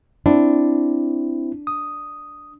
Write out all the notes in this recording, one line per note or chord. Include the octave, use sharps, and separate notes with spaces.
C4 D4 E4
D#6